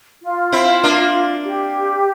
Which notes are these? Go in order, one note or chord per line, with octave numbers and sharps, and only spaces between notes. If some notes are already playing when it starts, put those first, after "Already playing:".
F4
C4 E4
A#3 D4
G4